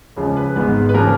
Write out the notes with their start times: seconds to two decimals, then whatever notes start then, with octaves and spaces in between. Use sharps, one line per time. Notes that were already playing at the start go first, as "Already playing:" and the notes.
0.16 C#2 C#3 F3
0.37 B4
0.56 G#1 G#2 D#3 G#3 B3 B4
0.89 B4
0.94 C#3 F3 A#3 A#4